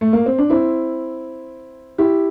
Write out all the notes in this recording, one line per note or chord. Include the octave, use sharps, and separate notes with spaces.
A3
A#3
C4
D4
C4 E4
E4 G4